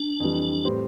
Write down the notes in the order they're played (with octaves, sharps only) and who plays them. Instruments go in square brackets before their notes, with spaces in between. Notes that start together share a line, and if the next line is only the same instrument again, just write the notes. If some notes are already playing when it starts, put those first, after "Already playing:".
Already playing: [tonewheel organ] D4
[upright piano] F2 E3 G3
A2 G3 C4 G4 B4